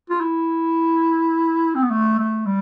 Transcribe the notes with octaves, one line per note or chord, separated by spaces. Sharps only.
F4
E4
C4
B3
A3
A3
G3